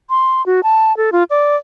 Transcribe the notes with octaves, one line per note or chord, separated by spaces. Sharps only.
C6
F#4
A5
A4
F4
D5